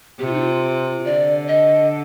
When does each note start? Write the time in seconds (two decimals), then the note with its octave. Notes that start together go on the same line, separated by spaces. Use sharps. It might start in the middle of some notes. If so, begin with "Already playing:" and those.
0.19 C3 G4
0.27 F4
0.33 D#4
0.40 F4
1.05 D3 D5
1.48 D#5